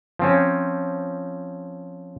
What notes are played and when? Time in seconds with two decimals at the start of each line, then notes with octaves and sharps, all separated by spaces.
0.19 F3 C4 C#4